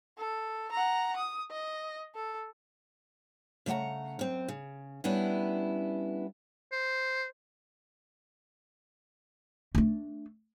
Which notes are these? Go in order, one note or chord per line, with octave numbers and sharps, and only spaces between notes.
A4
F#5 A#5
D#6
D#5
A4
C#3 A3 D5 F#5 A#5
F#2 C4
C#3
G3 B3 C#4 D4 E4
C5
A3 D4